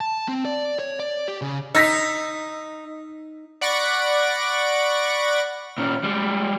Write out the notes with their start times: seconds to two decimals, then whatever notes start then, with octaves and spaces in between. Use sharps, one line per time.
0.01 A5
0.28 C4
0.45 D5
0.79 C#5
1.00 D5
1.28 G4
1.42 C#3
1.75 D#4 E6 A#6 B6
3.61 D5 F#5 B5 C#6 A#6 D7
5.78 A#2 C#4
6.04 G3 G#3